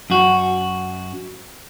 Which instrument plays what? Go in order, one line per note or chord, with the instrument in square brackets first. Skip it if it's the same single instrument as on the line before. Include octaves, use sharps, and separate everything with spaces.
[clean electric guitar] F#2 F#4